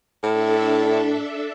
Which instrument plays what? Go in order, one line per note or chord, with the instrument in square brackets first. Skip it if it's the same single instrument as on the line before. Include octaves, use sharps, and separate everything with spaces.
[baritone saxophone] A2 [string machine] D4 A4 E5